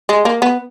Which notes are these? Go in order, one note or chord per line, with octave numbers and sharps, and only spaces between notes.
G#3
A#3
B3